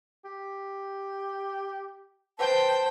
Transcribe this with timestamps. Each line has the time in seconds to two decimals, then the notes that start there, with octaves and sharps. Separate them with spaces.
0.25 G4
2.39 B4 C5 G5 A5